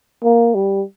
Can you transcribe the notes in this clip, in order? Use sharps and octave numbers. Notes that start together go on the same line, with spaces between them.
A#3
G3